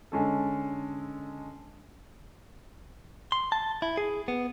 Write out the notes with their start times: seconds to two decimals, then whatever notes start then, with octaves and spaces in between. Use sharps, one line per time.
0.12 D3 G#3 C#4 A4
3.32 C6
3.52 A5
3.82 E4
3.97 G#4
4.28 B3